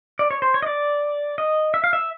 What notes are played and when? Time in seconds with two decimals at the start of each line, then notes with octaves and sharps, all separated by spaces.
0.19 D5
0.31 C#5
0.42 C5
0.54 C#5
0.62 D#5
0.66 D5
1.38 D#5
1.74 E5
1.84 F5
1.93 E5